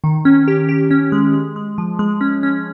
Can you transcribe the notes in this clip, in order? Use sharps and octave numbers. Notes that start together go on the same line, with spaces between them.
D#3
C#4
G4
G4
C#4
G#3
G#3
G#3
F3
G#3
C#4
C#4